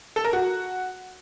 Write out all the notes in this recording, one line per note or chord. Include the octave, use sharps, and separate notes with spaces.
A4
A#4
F#4